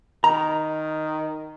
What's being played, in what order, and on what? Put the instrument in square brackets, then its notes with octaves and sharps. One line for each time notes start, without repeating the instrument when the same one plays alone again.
[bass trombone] D#3 [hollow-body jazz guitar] A#5